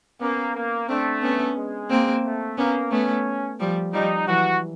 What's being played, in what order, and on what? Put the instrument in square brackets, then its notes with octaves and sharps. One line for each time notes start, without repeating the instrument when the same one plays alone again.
[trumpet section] A#3 [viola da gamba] B3 C#4
[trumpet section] A#3
[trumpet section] A3 [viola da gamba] C4 D4
[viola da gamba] B3 C#4
[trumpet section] G#3
[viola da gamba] A#3 C4
[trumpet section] A3
[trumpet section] A#3 [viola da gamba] B3 C#4
[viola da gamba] A3 B3 [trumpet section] C#4
[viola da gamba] F3 G3
[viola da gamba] F3 G3 [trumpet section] D#4
[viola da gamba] E3 F#3 [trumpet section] F#4